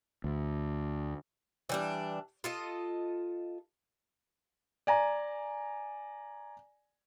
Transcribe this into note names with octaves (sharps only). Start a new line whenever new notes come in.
D2
E3 G3 D4
F4 A4 D#5
D5 G#5 A#5